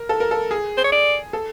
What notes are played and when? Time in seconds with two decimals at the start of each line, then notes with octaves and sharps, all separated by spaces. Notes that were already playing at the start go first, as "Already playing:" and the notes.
Already playing: A#4
0.09 A4
0.20 A#4
0.31 A4
0.51 G#4
0.78 C5
0.84 C#5
0.92 D5
1.33 A4